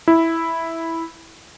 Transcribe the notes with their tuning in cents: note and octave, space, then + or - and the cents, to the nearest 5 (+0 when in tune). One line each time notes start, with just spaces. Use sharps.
E4 -5